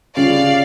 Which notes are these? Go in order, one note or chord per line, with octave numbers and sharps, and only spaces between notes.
C#3 G3 C#4 F4 D5 F5